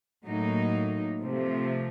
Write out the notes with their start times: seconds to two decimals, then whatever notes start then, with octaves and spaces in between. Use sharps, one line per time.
0.25 A2 F#3 A#3 D#4
1.21 C3 F3 A3